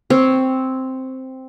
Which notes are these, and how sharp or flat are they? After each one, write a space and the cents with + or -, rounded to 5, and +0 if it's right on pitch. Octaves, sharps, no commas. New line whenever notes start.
C4 +0 C#5 +0